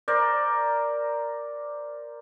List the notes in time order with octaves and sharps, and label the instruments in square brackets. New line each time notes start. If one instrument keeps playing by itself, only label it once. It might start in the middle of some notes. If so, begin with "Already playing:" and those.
[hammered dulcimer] A#4 C5 D5